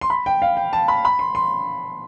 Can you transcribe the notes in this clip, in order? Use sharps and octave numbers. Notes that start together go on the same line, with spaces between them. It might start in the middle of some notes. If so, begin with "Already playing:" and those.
C6
B5
G5
F5
G5
A5
B5
B5
C6
C6